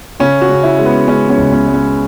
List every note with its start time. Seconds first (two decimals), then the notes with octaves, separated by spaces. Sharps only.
0.20 C#3 C#4
0.42 F#4
0.49 C#3
0.63 E4
0.79 G#3
0.86 B3
1.08 G#3 C#4
1.30 C#4
1.38 C#2
1.52 C#4
1.67 G#3
1.74 C#4